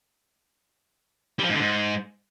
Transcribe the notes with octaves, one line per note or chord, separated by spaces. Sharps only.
G3
F3
G#2
D3
G#2